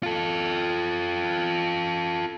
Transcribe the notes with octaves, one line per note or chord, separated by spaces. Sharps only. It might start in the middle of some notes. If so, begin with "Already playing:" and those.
F4 A4